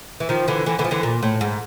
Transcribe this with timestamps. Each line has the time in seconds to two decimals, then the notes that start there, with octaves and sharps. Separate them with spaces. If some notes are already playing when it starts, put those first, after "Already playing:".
0.20 E3
0.29 D#3 F3
0.48 D3 E3
0.66 D3 E3
0.79 D3 E3
0.84 F3
0.91 D3 E3
1.03 A#2
1.23 A2
1.41 G#2